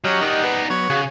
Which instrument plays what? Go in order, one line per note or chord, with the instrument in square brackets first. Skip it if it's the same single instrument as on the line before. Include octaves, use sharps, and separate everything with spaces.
[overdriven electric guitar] F#3 [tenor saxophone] C#4 [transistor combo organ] G4 D#5 F#5
[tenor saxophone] D#3 [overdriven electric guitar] D#4 D5
[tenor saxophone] B3
[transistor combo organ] F#3 B3 [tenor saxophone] C#5
[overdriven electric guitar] C#3 [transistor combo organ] F#4 G#4